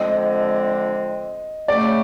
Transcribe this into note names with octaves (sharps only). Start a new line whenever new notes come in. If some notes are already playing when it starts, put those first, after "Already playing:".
Already playing: D3 F3 G#3 C4 D#5
C#3 F#3 A3 D5